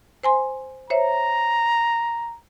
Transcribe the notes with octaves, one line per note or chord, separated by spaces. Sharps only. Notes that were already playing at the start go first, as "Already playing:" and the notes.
C5 G#5 C6
C5 C#5 E5 A#5